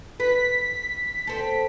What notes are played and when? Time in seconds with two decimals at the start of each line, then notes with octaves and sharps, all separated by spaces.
0.20 B4 B6
1.27 C4 A4